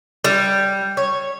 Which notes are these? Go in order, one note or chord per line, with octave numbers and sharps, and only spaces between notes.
G3
C#5